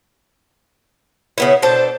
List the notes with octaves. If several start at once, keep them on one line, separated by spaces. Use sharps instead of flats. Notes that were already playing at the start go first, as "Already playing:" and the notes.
C#3 B3 E4
B2 D4 A4 C5